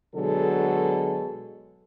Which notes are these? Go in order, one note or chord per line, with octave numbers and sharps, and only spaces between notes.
B2 D3 F#3 G#3 A4